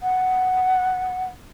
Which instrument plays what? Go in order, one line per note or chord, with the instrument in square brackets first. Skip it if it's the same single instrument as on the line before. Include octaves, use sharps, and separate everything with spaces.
[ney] F#5